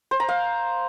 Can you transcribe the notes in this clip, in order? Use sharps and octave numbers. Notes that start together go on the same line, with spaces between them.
C5
A#5
F5